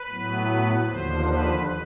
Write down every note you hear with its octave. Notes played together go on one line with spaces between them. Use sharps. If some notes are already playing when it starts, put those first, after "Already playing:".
Already playing: B4
A2 F#3 B3
D#2 D3 F3 C5
B4